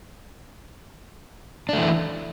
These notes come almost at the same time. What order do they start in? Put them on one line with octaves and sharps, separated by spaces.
D4 A3 E3